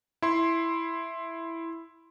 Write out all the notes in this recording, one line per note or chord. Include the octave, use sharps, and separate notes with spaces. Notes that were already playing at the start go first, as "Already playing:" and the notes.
E4 C6